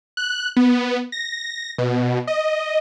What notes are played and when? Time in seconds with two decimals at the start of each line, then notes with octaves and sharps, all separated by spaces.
0.17 F#6
0.57 B3
1.12 A#6
1.78 B2
2.27 D#5